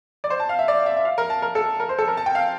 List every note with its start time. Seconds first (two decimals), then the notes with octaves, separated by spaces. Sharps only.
0.24 D5
0.30 C5
0.40 A5
0.49 F5
0.59 E5
0.68 D5
0.86 E5
0.97 E5
1.05 F5
1.18 A#4
1.30 A5
1.42 A#4
1.55 A4
1.80 A#4
1.89 C5
1.98 A4
2.08 A#4
2.17 A5
2.26 G5
2.35 F5